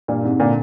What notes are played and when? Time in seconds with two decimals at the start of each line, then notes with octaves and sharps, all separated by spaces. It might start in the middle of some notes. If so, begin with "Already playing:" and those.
0.08 G2 A#2
0.24 G#2 C3
0.40 A#2 D3